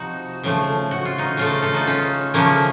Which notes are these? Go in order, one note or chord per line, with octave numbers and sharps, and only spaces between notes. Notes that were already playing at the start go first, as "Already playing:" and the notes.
Already playing: C3 F3 D#4 F#4
C#3 F3 A3
F#4
F4
D#4 F#4
C#3 A3 F4 A4
F4 A4
D#4 F#4
C#4 F4
C#3 F3 A3 A#3 C#4